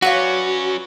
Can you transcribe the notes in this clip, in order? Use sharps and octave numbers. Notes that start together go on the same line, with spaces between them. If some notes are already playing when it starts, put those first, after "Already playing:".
F#3 C#4 F#4 B4 C#5 D5 F5 F#5